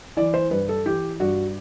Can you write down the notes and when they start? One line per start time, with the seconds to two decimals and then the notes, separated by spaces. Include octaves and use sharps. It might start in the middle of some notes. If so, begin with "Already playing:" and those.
0.17 E3 D5
0.34 C5
0.51 G2 B4
0.69 A4
0.86 E3 G4
1.20 G2 F#4